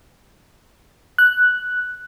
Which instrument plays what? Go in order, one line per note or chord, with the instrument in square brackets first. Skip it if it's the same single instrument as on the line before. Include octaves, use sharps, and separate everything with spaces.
[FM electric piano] F#6